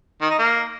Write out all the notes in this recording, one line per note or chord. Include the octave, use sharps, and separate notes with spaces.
D#3
D#4
A#3